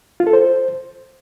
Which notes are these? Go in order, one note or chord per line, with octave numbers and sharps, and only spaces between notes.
F4
A4
C5